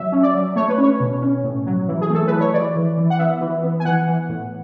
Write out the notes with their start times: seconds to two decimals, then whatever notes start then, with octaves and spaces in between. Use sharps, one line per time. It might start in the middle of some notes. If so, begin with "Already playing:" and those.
Already playing: F#3 E5
0.12 C#4
0.23 D5
0.34 F#3
0.56 A3 C#5
0.69 B4
0.78 C#4 C#5
1.00 B2
1.22 C#4
1.44 A2
1.66 F#3
1.88 E3
2.01 G#4
2.10 A3 A4
2.27 E3 B4
2.40 C#5
2.54 E3 D5
2.76 E3
2.97 E3
3.10 F#5
3.19 B3 E5
3.41 E3
3.63 B3
3.80 G#5
3.85 E3 F#5
4.07 E3
4.29 A2